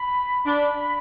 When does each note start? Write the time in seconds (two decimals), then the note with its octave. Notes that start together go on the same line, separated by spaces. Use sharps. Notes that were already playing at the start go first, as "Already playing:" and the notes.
Already playing: B5
0.45 D4 B5